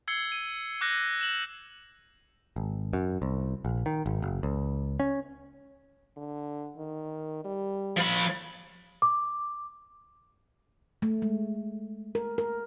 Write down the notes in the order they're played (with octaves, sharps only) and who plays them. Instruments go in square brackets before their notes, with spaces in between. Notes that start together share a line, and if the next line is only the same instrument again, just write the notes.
[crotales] E6 G#6 C7 C#7 G7
D#7
D6 E6 F#6 G6 A#6
E7 F#7
[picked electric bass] G#1
F#2
C2
A#1
D#3
G#1
F#1
C#2
C#4
[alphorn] D3
D#3
G3
[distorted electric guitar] F3 B5
[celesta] D6
[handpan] A3
G#3
A#4
A#4